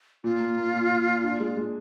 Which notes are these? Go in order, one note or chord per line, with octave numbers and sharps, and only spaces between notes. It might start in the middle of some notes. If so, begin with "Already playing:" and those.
A#2 F4
A#3
A#3
A#2
A#2
A#2
D4
G#3
G#3